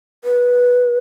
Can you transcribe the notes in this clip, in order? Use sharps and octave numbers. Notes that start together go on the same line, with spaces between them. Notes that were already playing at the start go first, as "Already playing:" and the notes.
B4